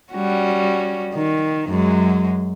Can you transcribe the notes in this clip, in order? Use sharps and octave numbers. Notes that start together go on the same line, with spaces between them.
G3 C#4 F#4
D#3
F#2 F#3 G#3